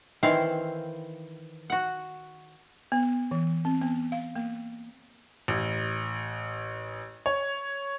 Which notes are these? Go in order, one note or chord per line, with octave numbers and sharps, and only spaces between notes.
D#3 E3 C4 E4 C5 F5
F#4 F#5
B3
E3
C4
B3
F5
A#3
A1
C#5